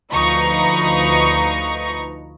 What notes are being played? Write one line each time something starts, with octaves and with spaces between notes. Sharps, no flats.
D2 F3 D#4 B4 A#5 C#6